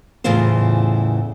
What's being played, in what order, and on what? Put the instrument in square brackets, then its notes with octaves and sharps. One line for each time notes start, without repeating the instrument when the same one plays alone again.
[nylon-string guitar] E2 A2 C#3 E3 F4 C5